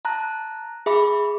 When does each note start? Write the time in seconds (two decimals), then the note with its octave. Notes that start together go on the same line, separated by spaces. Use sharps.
0.05 A5 A#5 F#6
0.86 G#4 E5 B5 D6